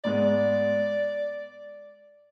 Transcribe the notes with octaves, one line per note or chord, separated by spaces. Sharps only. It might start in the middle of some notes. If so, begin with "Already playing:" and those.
G#2 G#3 B3 D5